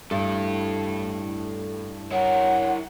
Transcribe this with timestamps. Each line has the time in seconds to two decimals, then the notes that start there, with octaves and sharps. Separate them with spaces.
0.11 G2 E4 A4
2.11 E4 A#4 C#5 F#5